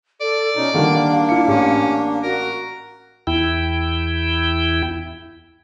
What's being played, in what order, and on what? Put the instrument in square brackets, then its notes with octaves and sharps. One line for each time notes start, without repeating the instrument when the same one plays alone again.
[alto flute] A4 [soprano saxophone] D5
[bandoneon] B2 D#4 [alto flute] C#4
[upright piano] D3 D#3 G3 [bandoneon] A#3 D4 [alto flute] F5
[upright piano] E4 C#7
[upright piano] A1 G4 [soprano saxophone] C#4
[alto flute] F#4 [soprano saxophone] A#4
[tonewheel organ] E2 E4 G5